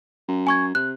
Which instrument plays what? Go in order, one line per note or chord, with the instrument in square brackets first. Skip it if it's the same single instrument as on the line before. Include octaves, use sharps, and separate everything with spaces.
[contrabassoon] F#2
[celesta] G#5 C#6 G#6
[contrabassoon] C3 [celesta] F#6